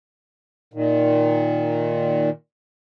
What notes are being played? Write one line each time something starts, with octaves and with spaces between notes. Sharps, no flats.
A#2 D#3